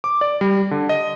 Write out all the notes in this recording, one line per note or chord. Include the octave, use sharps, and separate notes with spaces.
D6
D5
G3
D3
D#5